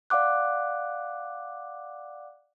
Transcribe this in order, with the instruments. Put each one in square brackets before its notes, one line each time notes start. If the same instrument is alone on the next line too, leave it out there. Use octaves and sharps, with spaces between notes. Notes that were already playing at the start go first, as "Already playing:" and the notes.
[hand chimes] D5 F5 F#5 D6 F#6